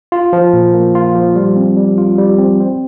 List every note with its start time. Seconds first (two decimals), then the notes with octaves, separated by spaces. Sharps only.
0.12 F4
0.33 F3
0.54 A#2
0.74 A#3
0.95 F4
1.15 F3
1.36 G3
1.56 C4
1.77 G3
1.98 F4
2.18 G3
2.38 C4
2.60 C4